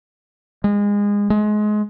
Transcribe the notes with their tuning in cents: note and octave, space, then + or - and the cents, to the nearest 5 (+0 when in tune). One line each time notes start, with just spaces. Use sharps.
G#3 -25
G#3 +25